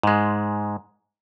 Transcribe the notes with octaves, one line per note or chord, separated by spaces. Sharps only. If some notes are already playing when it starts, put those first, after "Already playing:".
G#2 G#3